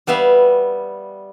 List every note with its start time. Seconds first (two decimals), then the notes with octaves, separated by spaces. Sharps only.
0.07 G3 B3 E5 F5